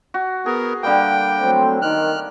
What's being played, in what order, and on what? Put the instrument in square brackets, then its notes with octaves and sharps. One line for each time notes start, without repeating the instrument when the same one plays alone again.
[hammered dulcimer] F#4
[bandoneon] B3 A#4 [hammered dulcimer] G#4
[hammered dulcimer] D3 G3 A#3 [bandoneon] G5
[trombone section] F#3 A3 C4
[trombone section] D#3 [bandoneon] F6 F#6